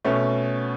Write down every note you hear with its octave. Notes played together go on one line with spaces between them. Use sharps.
B2 A3 C#4